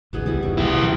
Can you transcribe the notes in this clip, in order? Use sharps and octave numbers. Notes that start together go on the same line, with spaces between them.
G#1 D2 B2 E3 B3 G#4
C#2 G3 E4
F1 G#2 C#3 C#6
C2 E4 G4
B2 D#3 F#3